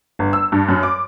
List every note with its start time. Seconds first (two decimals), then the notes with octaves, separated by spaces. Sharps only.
0.19 G1
0.33 E6
0.52 G2
0.69 F#2
0.83 D6